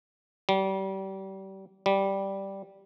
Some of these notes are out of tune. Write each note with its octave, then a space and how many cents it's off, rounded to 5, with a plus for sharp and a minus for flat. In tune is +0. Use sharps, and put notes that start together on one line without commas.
G3 -30
G3 -5